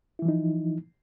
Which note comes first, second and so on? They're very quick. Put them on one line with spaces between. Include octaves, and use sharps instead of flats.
E4 E3 F3 D#4